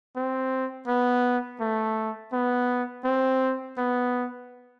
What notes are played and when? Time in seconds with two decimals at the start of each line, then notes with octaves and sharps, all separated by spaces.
0.16 C4
0.87 B3
1.60 A3
2.33 B3
3.04 C4
3.77 B3